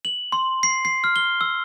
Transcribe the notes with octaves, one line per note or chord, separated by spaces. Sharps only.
F#7
C6
C7
C7
F6
G7
E6